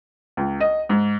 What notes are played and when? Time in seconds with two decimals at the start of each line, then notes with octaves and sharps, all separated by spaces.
0.37 C#2
0.60 D#5
0.89 G#2